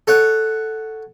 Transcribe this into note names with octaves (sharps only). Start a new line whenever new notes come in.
A4 C#5 F#5